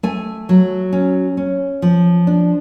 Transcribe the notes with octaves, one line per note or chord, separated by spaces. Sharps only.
A3 G#5
F#3
C#4
C#4
F3
D4